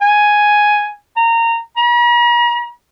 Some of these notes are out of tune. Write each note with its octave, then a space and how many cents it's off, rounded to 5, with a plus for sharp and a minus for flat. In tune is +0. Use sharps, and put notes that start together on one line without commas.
G#5 +5
A#5 -20
A#5 +45